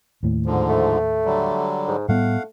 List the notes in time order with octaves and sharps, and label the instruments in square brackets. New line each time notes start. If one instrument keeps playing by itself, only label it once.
[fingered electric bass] D#2 A2
[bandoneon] G#2 D3 F3
[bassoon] A3
[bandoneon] D3 F#3 G3
[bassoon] G#2
[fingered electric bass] A2 G3 B3 [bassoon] A3 [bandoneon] F5 F#5